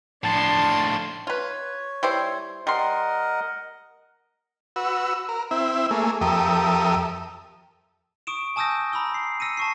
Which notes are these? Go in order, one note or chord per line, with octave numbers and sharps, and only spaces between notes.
A2 F3 D4 A5 C6
F4 B4 C#5
G3 E4 C5
G3 A#4 D#5 F#5 C6
F#4 B4 E6
A#4
C4 E4 E5
A3 A#3 G#4
F2 G4 A4 A#4 E5 D#6
C#6 D#6 D7 E7
G#5 A5 D#6 E6 G6 A#6
A#5 B5 D#6 E6 G7
C7
E6 A#6 C#7 D#7
A5 C#6 C7